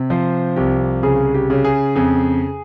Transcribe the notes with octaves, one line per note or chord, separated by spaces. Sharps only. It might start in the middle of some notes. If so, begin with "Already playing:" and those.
Already playing: C3
F3 C5
C2 G4
C#3 G#4
G4
C#3
G#4
F2 G#4